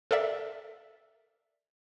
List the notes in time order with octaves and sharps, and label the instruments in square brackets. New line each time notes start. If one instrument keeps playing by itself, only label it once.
[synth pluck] A4 A#4 D5 E5